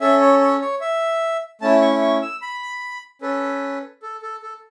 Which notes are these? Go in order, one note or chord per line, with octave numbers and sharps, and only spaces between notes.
C#4 A4 E5
C#5
C#5
C#5
E5
A3 C#4 E4 A5
C#6
C#6
E6
B5
C#4 A4 B4
A4
A4
A4